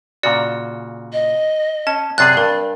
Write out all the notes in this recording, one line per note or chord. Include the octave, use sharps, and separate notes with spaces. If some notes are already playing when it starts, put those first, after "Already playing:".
A#2 C#3 F#4 D5
D#5
C#4 A5
F#2 C3 G#4 D5 F#6 A6 C7
G2 A#4